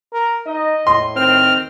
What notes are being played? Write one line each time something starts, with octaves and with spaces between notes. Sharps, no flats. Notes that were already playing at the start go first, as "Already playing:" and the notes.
A#4
D#4 D#5
A2 C6
D#3 C4 F6